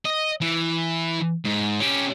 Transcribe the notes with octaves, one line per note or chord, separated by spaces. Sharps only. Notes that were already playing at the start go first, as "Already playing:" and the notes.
D#5
E3
G#2
C#4 G4